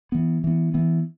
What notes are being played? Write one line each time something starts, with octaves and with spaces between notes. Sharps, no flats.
E3 B3
E3 B3
E3 B3